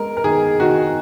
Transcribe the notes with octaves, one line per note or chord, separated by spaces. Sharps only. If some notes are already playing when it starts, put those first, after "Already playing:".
Already playing: G#3 A#4
A#4
D#3 G#4
D#3 F#4